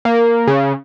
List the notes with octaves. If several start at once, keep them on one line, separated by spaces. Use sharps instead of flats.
A#3
C#3